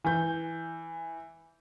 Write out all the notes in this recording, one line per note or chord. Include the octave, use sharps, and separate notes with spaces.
E3 G6